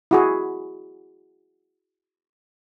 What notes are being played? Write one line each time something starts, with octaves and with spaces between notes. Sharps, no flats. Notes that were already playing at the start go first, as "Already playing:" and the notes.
E4 F#4 G#4